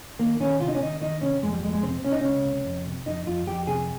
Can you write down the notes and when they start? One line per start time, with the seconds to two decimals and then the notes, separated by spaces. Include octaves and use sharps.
0.19 D#3 A#3
0.40 D#3 C#4
0.60 C3 F4
0.68 D#4
0.75 C#4
0.81 D#3 D#4
1.01 D#3 D#4
1.21 C3 C#4
1.42 F2 G#3
1.53 G3
1.63 F2 G#3
1.73 G#3
1.83 C3 C4
2.04 C3 C#4
2.12 D#4
2.20 C#2 C#4
2.45 C3
2.65 F2
2.86 C3
3.06 F2 D#4
3.26 F2 F4
3.47 F2 G4
3.67 C3 G#4